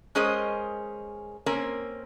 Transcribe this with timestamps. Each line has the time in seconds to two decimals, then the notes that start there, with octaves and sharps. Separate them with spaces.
0.15 G#3 C#4 G#4 A#4 C5 D#5
1.46 A#3 C4 C#4 A#4